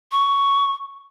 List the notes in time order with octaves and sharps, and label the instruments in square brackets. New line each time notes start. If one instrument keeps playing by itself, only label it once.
[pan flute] C#6